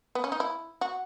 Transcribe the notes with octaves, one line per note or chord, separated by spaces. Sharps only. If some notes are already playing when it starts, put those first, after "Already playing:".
B3
C#4
D#4
E4
F#4